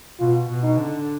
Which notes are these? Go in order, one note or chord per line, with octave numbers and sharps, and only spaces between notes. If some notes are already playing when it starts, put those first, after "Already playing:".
B2 F4
B2
D#4
D3